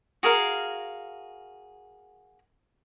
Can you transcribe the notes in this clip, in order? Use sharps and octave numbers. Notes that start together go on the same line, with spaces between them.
F#4 G#4 A#4 F5